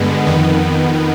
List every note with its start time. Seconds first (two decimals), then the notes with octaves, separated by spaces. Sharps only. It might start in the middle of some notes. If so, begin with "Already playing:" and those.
Already playing: G2 D3 G#3 B3
0.27 F2 D#3 B3